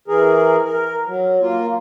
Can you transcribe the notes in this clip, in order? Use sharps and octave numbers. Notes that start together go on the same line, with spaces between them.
E3 G#4 A#4
A#4
F#3
A#3 F4